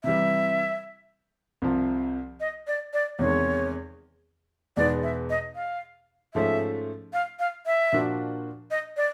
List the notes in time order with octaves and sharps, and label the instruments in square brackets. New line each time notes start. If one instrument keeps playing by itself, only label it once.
[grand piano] C3 E3 G3 [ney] E5
[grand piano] C2 C3 F3
[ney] D#5
D5
D5
[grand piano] E2 C3 D#3 G#3 [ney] C#5
[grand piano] E2 B2 G#3 B3 D#4 [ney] D5
[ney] E5
D#5
F5
[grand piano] G#2 F3 A3 C#4 [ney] E5
[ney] F5
F5
E5
[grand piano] A#2 F3 A#3 D4 F#4
[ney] D#5
D5